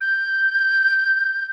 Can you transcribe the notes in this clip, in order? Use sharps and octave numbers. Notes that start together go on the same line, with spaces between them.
G6